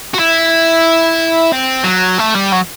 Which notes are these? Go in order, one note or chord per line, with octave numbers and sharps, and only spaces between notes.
F#4
E4
C4
F#3
A3
G3
F#3